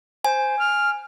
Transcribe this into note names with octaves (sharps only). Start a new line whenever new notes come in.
C5 G#5
F6